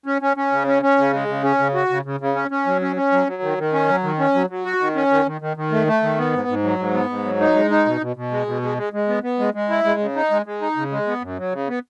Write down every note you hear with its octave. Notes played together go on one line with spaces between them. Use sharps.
C#4
C#4
C#4
C#3
C#4
C#4
C#3
G#3
C#3
C#4
C#3
F#4
C#3
C#3
C#3
C#4
C#4
F#3
C#4
C#4
F#3
F#3
D#3
D#3
C#4
F#3
D#3
C#4
F#3
F#3
F#4
D#3
C#4
D#3
D#3
D#3
D#3
A3
A3
D#3
B3
G#2
G#2
F#3
G#2
B3
G#2
F#3
D#4
G#3
D#4
B2
B2
B2
G#3
B2
G#3
G#3
G#3
B3
B3
G#3
G#3
E4
G#3
C#3
D#4
G#3
G#3
D#4
C#3
G#3
B3
F#2
F#3
C#3
B3